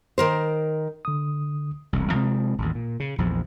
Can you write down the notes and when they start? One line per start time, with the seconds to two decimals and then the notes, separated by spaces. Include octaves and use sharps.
0.18 D#3 A#4 C5
1.05 D3 D#6
1.93 E1 C2
2.12 C3 F3 G#3 C4
2.58 A1 D#2
2.75 A#2
3.00 C#3
3.18 A#1 E2 F3